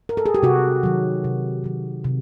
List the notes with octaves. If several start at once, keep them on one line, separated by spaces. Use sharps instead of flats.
A#4
A4
G#4
G4
C3 F#4
D#3 F#3
C3
D#3 F#3
C3